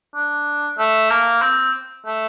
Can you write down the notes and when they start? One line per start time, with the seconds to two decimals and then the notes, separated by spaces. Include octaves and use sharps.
0.15 D4
0.79 A3
1.10 A#3
1.42 C4
2.06 A3